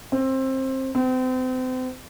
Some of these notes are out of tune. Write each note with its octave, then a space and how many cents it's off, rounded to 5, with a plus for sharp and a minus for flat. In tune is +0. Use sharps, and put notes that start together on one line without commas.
C4 +20
C4 -35